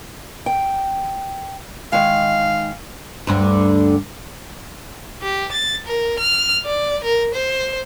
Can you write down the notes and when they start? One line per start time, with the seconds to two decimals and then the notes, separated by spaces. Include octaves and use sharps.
0.46 G5
1.92 D#3 G#3 F5
3.27 D2 G2 D3
5.22 G4
5.52 A6
5.86 A#4
6.20 F6
6.65 D5
7.04 A#4
7.34 C5